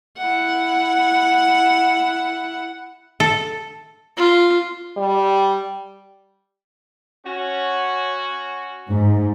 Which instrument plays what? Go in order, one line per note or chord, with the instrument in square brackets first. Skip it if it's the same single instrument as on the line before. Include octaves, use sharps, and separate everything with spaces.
[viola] E4 F#5
[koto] A4
[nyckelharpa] F4
[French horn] G3
[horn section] C#4 F#4
[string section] G#2